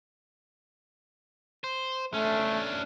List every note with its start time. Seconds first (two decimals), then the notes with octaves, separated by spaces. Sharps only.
1.64 C5
2.14 A3 C#4 D4